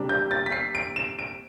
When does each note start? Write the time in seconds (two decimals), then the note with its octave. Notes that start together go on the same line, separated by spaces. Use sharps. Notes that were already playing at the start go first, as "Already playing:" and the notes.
Already playing: C3 G3 D4
0.09 G6
0.31 A6
0.46 B6
0.52 C7
0.75 D7
0.96 E7
1.19 D7